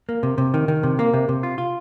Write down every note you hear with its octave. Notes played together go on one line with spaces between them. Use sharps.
A#3
C3
C3
D#3
D#3
C3
A#3
C3
C3
F4
F4